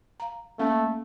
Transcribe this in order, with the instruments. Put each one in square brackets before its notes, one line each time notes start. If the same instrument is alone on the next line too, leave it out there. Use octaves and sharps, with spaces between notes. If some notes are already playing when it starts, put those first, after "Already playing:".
[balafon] F5 A#5
[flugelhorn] A3 [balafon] A#3 C#4